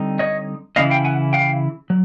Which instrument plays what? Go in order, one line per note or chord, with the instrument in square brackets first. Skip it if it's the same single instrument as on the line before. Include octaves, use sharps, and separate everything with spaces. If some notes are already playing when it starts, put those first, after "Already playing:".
Already playing: [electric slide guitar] D3 G3 C4 D#4
C#5 D#5
C#3 E3 G#3 C#4 E4 D#5 F5
F5 G5
F#5 G#5
F5 G5
F#3